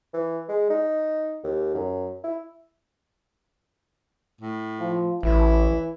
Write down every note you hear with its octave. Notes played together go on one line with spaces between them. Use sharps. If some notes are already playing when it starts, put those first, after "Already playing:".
E3
G#3
D#4
D#2
F#2
E4
A2
F3
A1 E3 E4